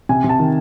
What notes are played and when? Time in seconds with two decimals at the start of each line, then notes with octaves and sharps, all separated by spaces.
0.09 C3 G#5
0.24 C3
0.29 A5
0.39 D#3